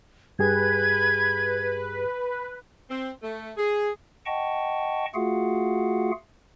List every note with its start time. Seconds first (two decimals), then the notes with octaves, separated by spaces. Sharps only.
0.39 G2 G4 G#4 B4 G#6
2.89 C4
3.23 A3
3.57 G#4
4.26 D#5 F#5 G5 A5 C#6
5.14 A3 F4 F#4 G#4 F5 F#5